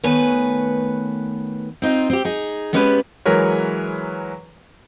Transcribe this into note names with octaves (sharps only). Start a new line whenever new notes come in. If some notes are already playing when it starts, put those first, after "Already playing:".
D#3 A3 B3 B4 C#5 G#5
C4 D#4 F4
C4 G4
D#4 G#4
G#3 B3 C#4 G4 A4 B4
E3 F#3 G#3 A#4 B4 C#5